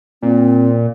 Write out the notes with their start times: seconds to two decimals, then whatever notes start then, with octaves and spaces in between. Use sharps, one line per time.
0.23 A#2 C4